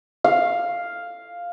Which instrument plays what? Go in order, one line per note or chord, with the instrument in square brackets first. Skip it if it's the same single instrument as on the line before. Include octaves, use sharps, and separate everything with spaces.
[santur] F5